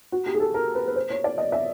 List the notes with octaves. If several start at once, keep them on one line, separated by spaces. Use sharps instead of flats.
F#4
G4
G#4
A4
A#4
B4
B4
C5
C#5
D5
D#5
E5